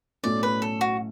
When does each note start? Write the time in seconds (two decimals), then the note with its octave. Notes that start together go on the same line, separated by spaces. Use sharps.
0.23 B1 A2 F#3 A3 C#4 D5
0.43 B4
0.62 A4
0.81 F#4